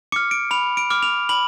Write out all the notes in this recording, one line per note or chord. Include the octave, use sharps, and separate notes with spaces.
D6 F6 C#7
D7
B5 F7
D7
D6 F6
F7
B5 F#7